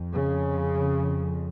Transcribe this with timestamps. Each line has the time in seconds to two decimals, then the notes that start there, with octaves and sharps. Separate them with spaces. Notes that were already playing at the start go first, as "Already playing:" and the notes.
Already playing: F2
0.14 C#3